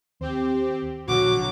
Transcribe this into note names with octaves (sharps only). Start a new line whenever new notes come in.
D#2 C4 G4
A#1 B2 D3 F#3 F#4 D6